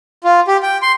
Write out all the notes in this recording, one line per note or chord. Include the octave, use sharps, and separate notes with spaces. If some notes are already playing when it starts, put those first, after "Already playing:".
F4
G4
G5
C6